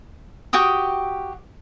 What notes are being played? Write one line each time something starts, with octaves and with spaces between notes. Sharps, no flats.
F#4 G4 G5 D#6